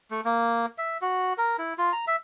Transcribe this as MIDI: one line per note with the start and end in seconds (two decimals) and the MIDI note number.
0.11 0.21 57
0.25 0.66 58
0.78 0.98 76
1.02 1.33 66
1.38 1.57 70
1.58 1.74 64
1.78 1.92 65
1.92 2.05 82
2.07 2.16 76